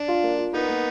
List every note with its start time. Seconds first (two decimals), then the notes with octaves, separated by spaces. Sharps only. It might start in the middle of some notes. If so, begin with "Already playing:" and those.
Already playing: D4
0.08 F4
0.23 A#3
0.38 F4
0.54 B3 D#4 A#4
0.69 A#3